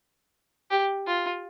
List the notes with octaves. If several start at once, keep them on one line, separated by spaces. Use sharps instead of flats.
G4
F4